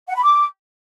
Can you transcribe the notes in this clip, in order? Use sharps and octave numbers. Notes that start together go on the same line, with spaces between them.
F#5
B5
D6